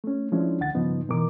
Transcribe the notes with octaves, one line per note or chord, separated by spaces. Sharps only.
A3 C#4
F3 G#3 C#4 D4 E4
C2 D3 F#5 A6
G2 C#3 F3 B3 D#4
B2 D#3 E3 A#4 D6